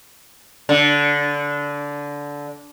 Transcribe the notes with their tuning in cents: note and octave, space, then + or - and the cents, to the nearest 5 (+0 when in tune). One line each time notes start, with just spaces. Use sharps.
D3 -20